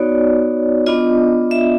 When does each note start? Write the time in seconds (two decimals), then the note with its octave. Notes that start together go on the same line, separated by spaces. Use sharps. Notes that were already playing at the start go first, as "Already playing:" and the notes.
Already playing: B3 D#4 F#4 C#5 D5
0.86 B3 D4 F4 D#5
1.51 E5